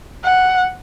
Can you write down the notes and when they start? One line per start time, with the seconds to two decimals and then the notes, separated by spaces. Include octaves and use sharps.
0.24 F#5